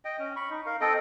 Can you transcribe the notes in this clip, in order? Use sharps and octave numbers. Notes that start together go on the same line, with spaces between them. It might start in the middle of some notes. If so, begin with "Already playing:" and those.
D#5 G5
C#4
B5 C#6
D#4
A#4 F5
C4 A4 D#5 G5